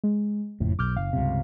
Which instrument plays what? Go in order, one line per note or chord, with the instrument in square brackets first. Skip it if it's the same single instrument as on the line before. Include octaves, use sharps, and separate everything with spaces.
[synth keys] G#3
[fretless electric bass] F#1 A2 [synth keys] F2
[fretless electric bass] B1 [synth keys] D6 F6 G6
[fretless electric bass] F#1 [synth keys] F5
[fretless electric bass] C#2 G2 C3